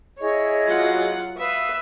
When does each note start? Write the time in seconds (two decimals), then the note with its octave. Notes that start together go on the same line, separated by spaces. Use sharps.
0.20 E4 G#4 C#5 D#5
0.67 F#3 F4 F#5
1.39 B4 E5 F5 D#6